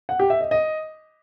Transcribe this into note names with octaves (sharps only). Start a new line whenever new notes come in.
F#5
G4
E5
D#5
D#5